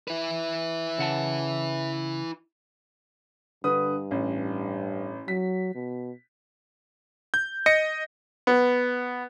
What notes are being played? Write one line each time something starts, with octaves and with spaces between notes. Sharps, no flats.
E4 B4
C#3 F#5 A5
G2 D3 B4 D#6
A1
F#3 B6
B2
G6
D#5 A#6 C#7
B3